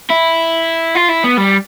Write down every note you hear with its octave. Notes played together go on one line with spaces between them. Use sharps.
E4
F4
E4
B3
G3